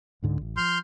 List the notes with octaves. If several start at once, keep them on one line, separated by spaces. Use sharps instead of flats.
C#2 G#2 D3
A1
F3 C6 F6 G6